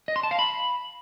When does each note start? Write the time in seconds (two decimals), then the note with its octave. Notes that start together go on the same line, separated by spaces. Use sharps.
0.08 D#5
0.16 C6
0.23 A5
0.31 F5
0.39 B5